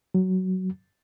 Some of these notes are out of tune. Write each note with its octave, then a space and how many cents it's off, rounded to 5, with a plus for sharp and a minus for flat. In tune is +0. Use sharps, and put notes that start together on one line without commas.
F#3 +10